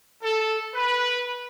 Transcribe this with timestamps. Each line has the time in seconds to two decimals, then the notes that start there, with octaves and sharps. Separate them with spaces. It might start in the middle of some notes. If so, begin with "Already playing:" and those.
0.23 A4
0.74 B4